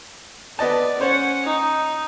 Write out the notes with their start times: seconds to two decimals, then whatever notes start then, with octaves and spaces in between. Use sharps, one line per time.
0.59 B3 B4 D5 D#5 A5
1.01 C#4 C5 C#5 F#5
1.44 D#4